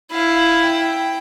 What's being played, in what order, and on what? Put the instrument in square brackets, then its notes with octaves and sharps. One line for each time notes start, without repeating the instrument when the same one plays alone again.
[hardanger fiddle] E4 [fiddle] F5
[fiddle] G5